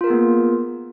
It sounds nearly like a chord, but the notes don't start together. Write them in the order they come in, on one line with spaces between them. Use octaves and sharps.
F4 A#4 G#4 B3 A#3